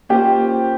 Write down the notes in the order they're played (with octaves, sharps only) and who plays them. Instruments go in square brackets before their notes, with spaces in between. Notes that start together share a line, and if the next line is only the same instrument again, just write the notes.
[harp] A#3 C#4 F4 C5 [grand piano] G4